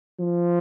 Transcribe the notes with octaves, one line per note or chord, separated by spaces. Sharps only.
F3